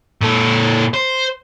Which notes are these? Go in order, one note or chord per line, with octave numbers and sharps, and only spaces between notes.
A#2 A4
C5